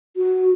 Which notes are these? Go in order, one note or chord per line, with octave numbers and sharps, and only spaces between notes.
F#4